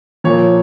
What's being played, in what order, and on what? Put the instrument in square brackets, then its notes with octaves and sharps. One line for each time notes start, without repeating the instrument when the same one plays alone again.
[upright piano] A#2 F3 C#5